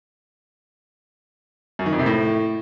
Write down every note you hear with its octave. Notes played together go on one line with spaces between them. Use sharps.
F#2
D#3
F2
C3
A2